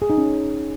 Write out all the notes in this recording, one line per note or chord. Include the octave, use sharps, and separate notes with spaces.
G#4
D#4
C#4